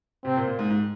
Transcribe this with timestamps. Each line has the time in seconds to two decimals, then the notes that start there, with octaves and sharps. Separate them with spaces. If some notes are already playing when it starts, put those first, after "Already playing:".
0.25 C3 C4
0.36 A#2
0.47 A#2
0.59 G#2
0.70 G#2